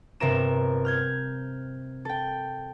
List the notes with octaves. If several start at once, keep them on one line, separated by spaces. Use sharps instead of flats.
G1 C3 A#4 E7
F6 G6 G#6
A4 G5